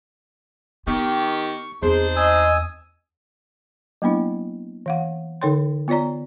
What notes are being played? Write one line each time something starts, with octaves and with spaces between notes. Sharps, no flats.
D#3 B3 G4 C#6
E2 C4 D4 D#4 G#4 C5
D#5 G#5 D#6 E6
F#3 A#3 B3 D4 E4
E3 F5 F#5
D3 D#4 A4 C#5 G5 C6
B3 F4 C#5 D5 A#5